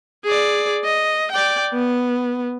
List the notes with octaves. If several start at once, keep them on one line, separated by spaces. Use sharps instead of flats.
G#4 D5
D#5
D5 G5
B3